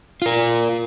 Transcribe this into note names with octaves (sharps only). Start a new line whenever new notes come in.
F4 A#4